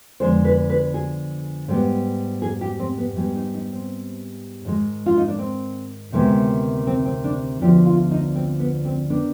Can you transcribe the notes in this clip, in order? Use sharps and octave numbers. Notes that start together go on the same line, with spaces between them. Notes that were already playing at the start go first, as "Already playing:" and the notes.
F2 D3 G#3 B3 C5
B4
B4
G#4
G#2 G3 B3
G#4
G4
C4
B3
G#2 G3 B3
D#4
D#4
C4
G#2 D#3 G#3
F4
D#4
D4
C4
D2 C3 D#3 G#3 B3
C4
C4
D4
D2 D3 F3 B3 G4
F4
D#4
C4
B3
C4
D#3 B3 D4